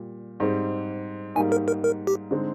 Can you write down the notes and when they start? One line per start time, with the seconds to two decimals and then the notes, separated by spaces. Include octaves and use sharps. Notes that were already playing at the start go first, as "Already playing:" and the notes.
Already playing: A#2 G3
0.40 G#2 G3 C4
1.35 G#2 G3 A#3 D#4 G#5
1.52 A#4
1.68 A#4
1.84 A#4
2.07 G4
2.31 D3 G#3 C4 D#4